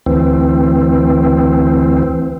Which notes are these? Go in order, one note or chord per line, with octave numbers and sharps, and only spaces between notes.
D2 E3 C4